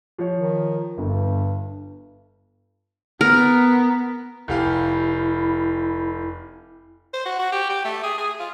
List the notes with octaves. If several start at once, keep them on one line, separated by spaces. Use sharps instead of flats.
F3 C#5
D#3
G1 G2
B3 A#4
F1 E4 G4 F5
C5
F#4
F#4
G4
G4
A3
G#4
G#4
F4